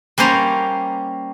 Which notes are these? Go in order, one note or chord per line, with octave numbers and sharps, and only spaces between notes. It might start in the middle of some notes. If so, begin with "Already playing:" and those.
G3 A#3 C#4 C5 A#5